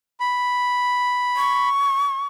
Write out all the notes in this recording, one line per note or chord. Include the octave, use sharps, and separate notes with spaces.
B5
C#6